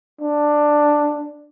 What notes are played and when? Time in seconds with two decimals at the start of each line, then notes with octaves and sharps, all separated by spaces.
0.21 D4